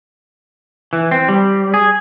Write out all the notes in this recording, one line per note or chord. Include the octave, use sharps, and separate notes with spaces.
E3
C4
G3
G#4